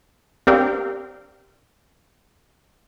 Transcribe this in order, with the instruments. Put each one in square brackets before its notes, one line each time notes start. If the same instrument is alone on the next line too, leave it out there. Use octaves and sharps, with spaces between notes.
[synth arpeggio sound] C4 D4 G4 A#4 F5 G5